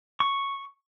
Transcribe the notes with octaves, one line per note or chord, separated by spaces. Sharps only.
C#6